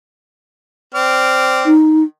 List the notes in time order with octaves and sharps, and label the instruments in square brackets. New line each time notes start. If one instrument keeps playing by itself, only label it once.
[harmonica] C4 D5 F6
[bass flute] D#4